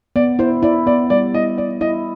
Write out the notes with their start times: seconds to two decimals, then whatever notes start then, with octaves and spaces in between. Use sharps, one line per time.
0.16 B3 D5
0.39 E4 C5
0.62 E4 D5
0.87 B3 D5
1.10 G3 D5
1.34 E4 D#5
1.58 E4 D5
1.81 E4 D#5